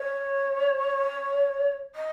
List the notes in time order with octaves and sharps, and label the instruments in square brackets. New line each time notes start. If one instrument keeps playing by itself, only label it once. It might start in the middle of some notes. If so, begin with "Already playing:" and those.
Already playing: [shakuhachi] C#5
D#5